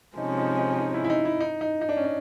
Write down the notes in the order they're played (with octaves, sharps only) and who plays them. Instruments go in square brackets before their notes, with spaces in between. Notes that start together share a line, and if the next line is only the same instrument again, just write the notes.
[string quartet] C3 F3 G#3 C#4 [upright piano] D#4
[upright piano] D#4
D#4
D#4
E4
E4
D#4
E4
D#4
D#4
D#4
D4
C#4
D4